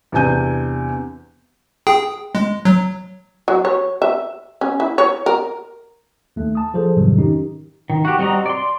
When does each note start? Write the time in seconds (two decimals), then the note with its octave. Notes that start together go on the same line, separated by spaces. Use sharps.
0.12 E2 C3 D4 G#5 G6 D#7
1.87 G#4 G5
2.35 G#3
2.65 F#3
3.48 F#3
3.65 C#5
4.02 E5
4.61 C#4
4.80 E4
4.98 C#5
5.26 A#4
6.36 D#2 A3
6.55 A5 D#6
6.74 F3 G#4 A4 C5
6.97 F2 G#2 C3 D#3 F#3 G3
7.18 D#3 C#4 D#4 G4
7.90 D#3
8.05 F#4 G4
8.18 G3 C4 F#4 D#5 A#5
8.46 D5 C6